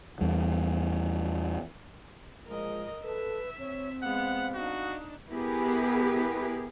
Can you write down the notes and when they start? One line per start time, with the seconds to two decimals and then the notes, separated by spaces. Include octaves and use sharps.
0.21 E2 G3
2.47 A#2 F3 G#3 A#4 D#5
3.03 A4 B4 E5
3.59 C4 C#5
4.03 G#3 B3 F5 F#5
4.54 D4 D#4 F#4
5.31 B3 E4 G4 G#4 A#4 B4